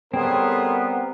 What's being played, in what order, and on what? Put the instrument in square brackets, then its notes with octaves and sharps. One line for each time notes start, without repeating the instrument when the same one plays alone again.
[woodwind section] A2 G#4 C6 [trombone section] G3 B3 [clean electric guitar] C4 [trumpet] A#4